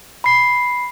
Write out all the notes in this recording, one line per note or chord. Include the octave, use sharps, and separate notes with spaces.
B5 C7